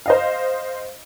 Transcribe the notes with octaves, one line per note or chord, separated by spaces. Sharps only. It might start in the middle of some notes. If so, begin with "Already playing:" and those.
C5 D#5 F5